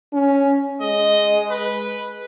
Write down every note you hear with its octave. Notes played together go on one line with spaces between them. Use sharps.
C#4
G#3 D#5
B4